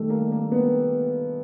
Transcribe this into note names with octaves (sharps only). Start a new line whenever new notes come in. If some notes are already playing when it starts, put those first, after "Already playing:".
Already playing: D#3 G3 A3
A#3
A#3
B3